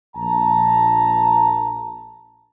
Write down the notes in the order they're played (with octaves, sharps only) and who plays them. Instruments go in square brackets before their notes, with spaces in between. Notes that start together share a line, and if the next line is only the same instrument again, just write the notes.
[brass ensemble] A#1 A5 A#5